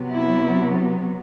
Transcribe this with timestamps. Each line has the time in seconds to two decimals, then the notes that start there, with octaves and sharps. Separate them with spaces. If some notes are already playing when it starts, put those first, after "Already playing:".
Already playing: C3 F#3 B3
0.13 E4